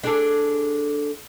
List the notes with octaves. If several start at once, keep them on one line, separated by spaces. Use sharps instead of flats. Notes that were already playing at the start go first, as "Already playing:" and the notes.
D4 G#4 A4